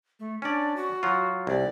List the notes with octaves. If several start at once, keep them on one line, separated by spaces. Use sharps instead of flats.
A3
C#4 D4 D5
F#4
F#3 F4
C2 D5